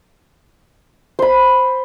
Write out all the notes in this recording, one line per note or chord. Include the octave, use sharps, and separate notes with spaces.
C5 B5